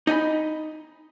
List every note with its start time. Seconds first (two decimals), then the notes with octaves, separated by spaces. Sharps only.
0.07 D#4 D#5 G#5 B5